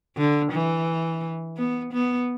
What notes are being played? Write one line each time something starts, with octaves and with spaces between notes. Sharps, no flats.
D3
E3
B3
B3